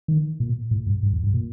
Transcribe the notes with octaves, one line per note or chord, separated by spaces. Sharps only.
D#3
A#2
A2
G2
G2
F2
G2
A#2